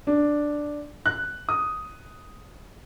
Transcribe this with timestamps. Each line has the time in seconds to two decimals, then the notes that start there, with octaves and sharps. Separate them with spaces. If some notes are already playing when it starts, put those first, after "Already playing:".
0.07 D4
1.06 F#6
1.49 D#6